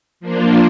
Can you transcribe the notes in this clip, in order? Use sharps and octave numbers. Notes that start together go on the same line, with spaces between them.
F3 A#3 D4 F4